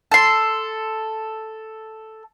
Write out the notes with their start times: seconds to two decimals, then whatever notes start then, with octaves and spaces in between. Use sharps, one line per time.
0.12 A4 C6